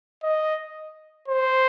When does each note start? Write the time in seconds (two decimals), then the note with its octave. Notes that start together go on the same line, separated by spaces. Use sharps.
0.24 D#5
1.29 C5